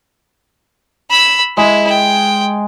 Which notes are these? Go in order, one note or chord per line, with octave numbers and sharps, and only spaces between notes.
B5 E6
G#3 E4
G5